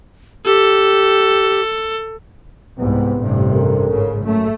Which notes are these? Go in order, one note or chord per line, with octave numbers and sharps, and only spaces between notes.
G4 A4
C2 G#2 C3 B3
A1 G2 C3
A4 A#4
G#2 C#3
F#2 A3